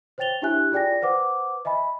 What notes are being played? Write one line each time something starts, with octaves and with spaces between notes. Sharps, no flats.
C5 C#5 G5 A6 F7 G7
D4 E4 G4 E5 G#5 F#6
F4 G#4 D5 G5 G#5 A#6
B4 C5 F#5 D6
D#5 E5 G#5 B5